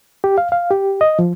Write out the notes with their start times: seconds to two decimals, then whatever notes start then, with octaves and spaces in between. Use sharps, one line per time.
0.24 G4
0.38 F5
0.52 F5
0.71 G4
1.01 D#5
1.19 F3